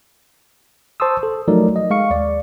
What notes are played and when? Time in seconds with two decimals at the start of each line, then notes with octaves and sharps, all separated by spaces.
1.00 C5 A5 C6 C#6 D#6 E6
1.23 A4
1.48 F3 F#3 A3 D#4 A#4 D5
1.76 D#5
1.90 G#3 F5 C#6 C#7
2.10 D#2 D5